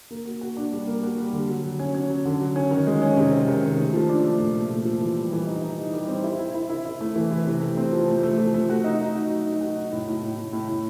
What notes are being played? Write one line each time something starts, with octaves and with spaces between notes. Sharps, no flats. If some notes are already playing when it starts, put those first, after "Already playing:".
A#3
F#4
F#4
D4
G3
A#3
F#4
G3
D3
F#3
F#3
C#4
C#4
F#3
D3
F#3
C#4
D#3
G#3
C#4
C3
C3
D#3
C3
A3
F3
D4
A3
A#2
A3
A#2
F3
E3
G3
E3
D#4
D#4
G3
G3
C4
E4
E4
E4
E4
E4
A3
E3
E3
C3
A3
C4
F3
A3
A3
F3
A3
F#4
D#4
D#4
F#4
F#3
D#4
F#4
D#4
A2
A2
A2
A2
A2
A2